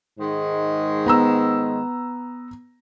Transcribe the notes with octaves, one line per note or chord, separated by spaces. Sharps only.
G#2 D#3 G#3
B3 A#5 E6